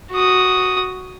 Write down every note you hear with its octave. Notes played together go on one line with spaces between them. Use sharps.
F#4 D#6